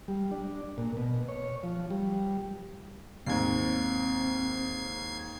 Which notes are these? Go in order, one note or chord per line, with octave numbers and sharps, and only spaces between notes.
G3
D4
A#2
B2
C#5
F3
G3
D#2 G#2 C4 G#6 C7